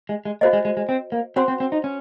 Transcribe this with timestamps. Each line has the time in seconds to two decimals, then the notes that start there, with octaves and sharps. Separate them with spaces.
0.09 G#3
0.25 G#3
0.41 A#3 F#4 C5 D#5
0.53 G#3
0.65 G#3
0.77 G#3
0.89 C4
1.12 A#3
1.36 C4 F#4 C5 F#5 C6
1.48 C4
1.60 C4
1.72 D#4
1.84 C#4